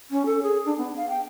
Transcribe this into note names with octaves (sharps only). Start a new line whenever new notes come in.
C#4
A4
G#4
D4
B3
F5
G5